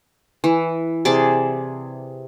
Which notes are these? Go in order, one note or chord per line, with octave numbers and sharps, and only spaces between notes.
E3
C3 G#4 D5 A5